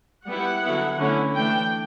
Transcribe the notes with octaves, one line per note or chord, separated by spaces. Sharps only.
G3 B3 E4 F#5
D3 F#3 B3 E4
D3 A3 C#4 E4
E3 A3 D4 G5